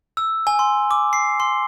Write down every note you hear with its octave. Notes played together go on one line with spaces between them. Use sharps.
E6
G#5
C6
D6
C7
C6